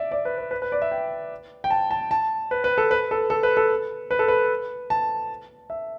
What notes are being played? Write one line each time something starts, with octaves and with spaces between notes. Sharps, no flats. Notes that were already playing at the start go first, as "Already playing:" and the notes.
Already playing: D5 E5
D5
B4
B4
B4
B4
D5
E5
G5
G5
A5
A5
A5
B4
B4
A4
B4
A4
A4
B4
A4
B4
A4
B4
A5
E5